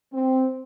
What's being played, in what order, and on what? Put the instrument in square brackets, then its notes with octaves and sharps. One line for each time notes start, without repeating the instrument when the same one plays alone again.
[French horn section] C4